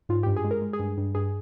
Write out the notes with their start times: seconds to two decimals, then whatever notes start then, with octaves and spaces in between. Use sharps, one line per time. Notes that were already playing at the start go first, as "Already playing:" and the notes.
0.09 G#2 F4
0.23 G2 G4
0.36 G#4
0.44 G#3
0.51 A#4
0.62 G#3
0.73 G#4
0.79 G2
0.97 G2
1.15 G2 G#4